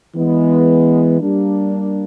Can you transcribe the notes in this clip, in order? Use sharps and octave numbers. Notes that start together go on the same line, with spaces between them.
E3 G#3 B3
G3 A#3 D4